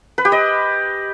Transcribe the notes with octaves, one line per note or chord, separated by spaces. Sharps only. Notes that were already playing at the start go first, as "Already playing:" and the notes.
B4
G4
D#5